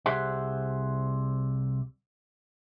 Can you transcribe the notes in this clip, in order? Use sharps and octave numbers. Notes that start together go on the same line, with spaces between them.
C2 G4 G#4 C5 E5 F#5